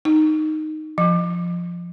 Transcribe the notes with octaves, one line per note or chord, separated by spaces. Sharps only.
D#4
F3